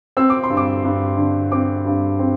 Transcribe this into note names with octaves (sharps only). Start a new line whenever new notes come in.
C4 E6
D6
C6
G2
D6
G2
D3
C4 D6
G2
C4